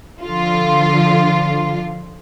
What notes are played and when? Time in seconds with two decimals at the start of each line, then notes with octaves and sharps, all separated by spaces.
0.24 D3 F3 F4